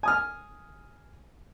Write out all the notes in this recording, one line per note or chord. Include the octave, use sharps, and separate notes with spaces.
G#5 D#6 F6